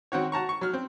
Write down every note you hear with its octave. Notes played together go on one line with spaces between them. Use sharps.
D#3 C4 F#4 C#5
F#4 A5 A#5 C#6
C#6
F#3 F6
C4